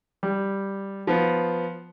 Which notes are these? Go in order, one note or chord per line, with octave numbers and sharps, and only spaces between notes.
G3
F3 B3